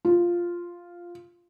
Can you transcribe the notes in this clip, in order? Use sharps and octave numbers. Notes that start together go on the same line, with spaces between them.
F4